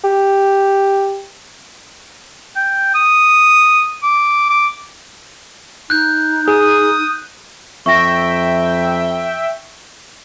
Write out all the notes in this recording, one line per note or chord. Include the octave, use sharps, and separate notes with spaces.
G4
G5
D#6
D6
D6
D#4 F#6 G6
G#4 D#6
F2 E5 G5 C#6 A#6